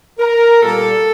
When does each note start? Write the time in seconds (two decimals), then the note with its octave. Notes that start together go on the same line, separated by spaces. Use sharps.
0.19 A#4
0.62 A#2 G3 A#3 A4